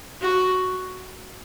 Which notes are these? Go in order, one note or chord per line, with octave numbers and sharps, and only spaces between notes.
F#4